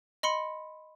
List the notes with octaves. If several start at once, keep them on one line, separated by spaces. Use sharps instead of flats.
D#5 B5 C6 C#7